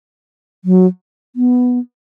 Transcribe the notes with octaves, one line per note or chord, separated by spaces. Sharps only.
F#3
B3